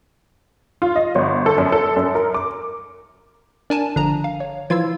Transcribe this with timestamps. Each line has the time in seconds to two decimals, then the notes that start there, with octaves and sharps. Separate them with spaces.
0.82 F4
0.96 D#5
1.15 G1
1.46 A4
1.58 F#2
1.72 A4
1.96 F#2
2.15 A#4
2.34 D6
3.70 D4 A#4 G#5 A5
3.96 G1 D3 F3 A#5
4.24 F5
4.40 C#5
4.70 E3 F3 F4 E6 G#6